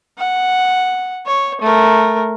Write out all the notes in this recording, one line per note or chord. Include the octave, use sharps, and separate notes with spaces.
F#5
C#5
A3 A#4